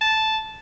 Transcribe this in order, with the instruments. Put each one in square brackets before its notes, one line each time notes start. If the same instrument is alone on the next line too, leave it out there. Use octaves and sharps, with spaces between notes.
[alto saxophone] A5